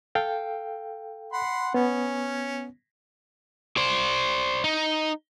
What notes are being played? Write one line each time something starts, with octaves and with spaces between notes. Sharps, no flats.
A4 F5 G5
F#5 B5 C6
B3 C#4
C5 D5
D#4